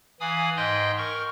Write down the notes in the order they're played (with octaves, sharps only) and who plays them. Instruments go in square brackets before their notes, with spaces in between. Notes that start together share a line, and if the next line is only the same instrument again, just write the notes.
[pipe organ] E3 F5 G#5 B5 D#6
G#2 D#5 G5 C6 G6
A#4 C#6